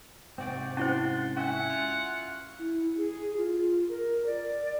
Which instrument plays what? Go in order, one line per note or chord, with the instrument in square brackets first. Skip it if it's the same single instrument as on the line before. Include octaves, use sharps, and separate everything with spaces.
[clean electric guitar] G#2 C3 D5 [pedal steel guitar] C4 F#4 G5
[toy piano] C#4 E4 C5 [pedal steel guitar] F#5 A5 [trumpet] C6
[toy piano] C#4 [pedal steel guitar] F#4 E5 G#5 [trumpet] F#5
[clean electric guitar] F4
[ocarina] E4
G#4
F4
A#4
D5